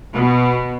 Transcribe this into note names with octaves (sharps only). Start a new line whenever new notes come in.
B2